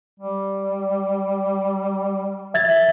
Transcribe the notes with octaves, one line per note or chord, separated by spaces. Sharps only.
G3
E5 G#6 A6